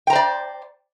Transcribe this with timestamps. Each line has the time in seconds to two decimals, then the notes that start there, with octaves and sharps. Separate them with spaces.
0.07 G5
0.10 A#5
0.13 C5
0.15 D5